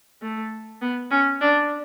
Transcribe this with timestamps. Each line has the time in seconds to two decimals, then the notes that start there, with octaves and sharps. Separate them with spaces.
0.22 A3
0.82 B3
1.11 C#4
1.41 D4